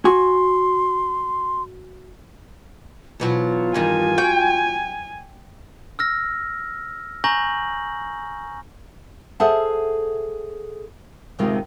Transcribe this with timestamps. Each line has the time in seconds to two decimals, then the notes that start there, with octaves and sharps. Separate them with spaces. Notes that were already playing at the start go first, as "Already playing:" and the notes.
0.05 F#4 G#5 C6
3.20 E2 B2 F#3 F4
3.74 E2 G2 D#3 G#5
4.18 F#4 G5
5.99 E6 F6 A#6
7.24 G#5 A#5 C#6 G6 A#6 F#7
9.40 G#4 A4 C5 E5 F#5 A5
11.39 D2 A2 C3 D#3 G#3 F4